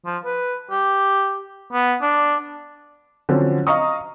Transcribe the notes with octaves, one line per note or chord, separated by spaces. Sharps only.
F3
B4
G4
B3
D4
D3 F3 F#3 C4 C#4
D#5 F5 A#5 C#6 D#6